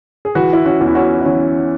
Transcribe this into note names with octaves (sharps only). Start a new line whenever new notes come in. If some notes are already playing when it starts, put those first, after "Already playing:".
G#4
E3 F#4 B4
E4
C#4 F#4
E2
E4
C#4 F#4
E4
E3 C#4